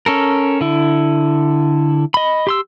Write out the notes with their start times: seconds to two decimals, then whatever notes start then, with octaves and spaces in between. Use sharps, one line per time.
0.06 C#4 A4 A#4
0.61 D3 E4
2.14 D#5 B5
2.47 G4 C6 E6